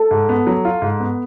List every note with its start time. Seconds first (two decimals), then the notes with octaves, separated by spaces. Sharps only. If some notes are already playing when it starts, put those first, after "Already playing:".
Already playing: A4
0.11 G#2
0.29 B3
0.47 F#3
0.65 F4
0.82 G#2
1.00 B3